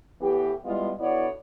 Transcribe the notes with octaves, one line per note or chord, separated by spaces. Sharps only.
A2 E3 B3 G4
G3 G#3 B3 E4 F4
D3 B3 E4 F#4 C#5 D5